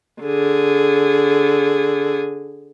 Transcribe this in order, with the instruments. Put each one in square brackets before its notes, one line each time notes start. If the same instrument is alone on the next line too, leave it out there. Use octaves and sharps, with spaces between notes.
[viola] D3 G#4